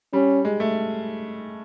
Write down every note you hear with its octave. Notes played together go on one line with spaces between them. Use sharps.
G3 C#4
G#3
A3